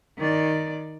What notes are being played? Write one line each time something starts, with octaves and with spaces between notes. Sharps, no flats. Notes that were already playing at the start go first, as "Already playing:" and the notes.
D#3 D5